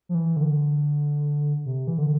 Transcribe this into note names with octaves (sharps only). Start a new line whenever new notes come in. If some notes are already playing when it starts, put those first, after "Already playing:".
F3
E3
D3
C3
E3
D3